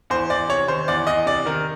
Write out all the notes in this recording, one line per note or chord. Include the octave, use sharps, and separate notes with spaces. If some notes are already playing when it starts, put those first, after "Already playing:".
E2 C5
E2 D5
C3 C#5
D#3 C5
E2 D5
E2 D#5
C3 D5
D#3 A#4